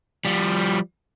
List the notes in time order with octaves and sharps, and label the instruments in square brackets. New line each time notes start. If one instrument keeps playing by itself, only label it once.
[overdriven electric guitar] F3 G3